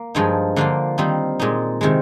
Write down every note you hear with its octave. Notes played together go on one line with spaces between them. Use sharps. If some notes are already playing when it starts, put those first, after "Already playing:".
Already playing: A#3
G2 F3 G#3 D#4
D3 F3 A#3 F4
D#3 G3 C4 D#4
A#2 G#3 D#4
C3 D#3 G#3